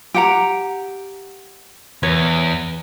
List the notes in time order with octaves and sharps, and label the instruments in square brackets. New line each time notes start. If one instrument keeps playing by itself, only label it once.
[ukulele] G4 F#5 A#5
[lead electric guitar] E2 [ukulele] B4 C#5